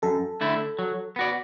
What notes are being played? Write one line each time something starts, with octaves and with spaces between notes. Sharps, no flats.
F#2 A4
D3 A3 E4
F#3
B3 F#4 D5